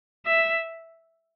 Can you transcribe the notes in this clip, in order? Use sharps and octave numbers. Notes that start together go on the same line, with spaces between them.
E5